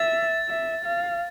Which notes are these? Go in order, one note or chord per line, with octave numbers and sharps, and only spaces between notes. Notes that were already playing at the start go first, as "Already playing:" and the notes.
Already playing: E5 A6
E5
F5